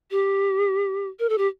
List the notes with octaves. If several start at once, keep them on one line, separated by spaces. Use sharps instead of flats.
G4
A#4
A4
G4